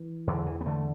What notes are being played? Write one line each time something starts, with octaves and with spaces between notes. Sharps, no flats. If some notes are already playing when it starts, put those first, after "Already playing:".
Already playing: E3
E2 D3
E3
B3
D3 A3